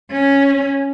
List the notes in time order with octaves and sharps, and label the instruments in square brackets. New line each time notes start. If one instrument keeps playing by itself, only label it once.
[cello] C#4